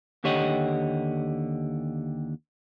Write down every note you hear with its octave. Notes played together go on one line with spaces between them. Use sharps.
D#2 D3 G4 C#5 D#5 F#5